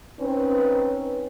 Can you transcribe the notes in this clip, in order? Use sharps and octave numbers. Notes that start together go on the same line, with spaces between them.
C4 C#4 D#4 B4